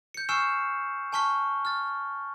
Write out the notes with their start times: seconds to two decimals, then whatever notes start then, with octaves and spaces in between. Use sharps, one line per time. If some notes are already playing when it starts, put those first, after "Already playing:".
0.14 G6 C#7
0.29 G#5 C#6 E6 F6 C7 E7
1.12 G#5 A5 C#6 F6 B6 G7
1.65 F6 A6